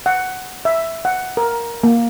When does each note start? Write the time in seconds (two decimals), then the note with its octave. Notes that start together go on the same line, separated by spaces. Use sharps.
0.06 F#5
0.65 E5
1.05 F#5
1.37 A#4
1.83 A#3